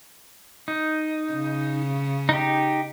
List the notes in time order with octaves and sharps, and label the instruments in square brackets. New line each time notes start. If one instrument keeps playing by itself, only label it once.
[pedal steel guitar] D#4
[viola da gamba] C#3
[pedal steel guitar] D#4 G4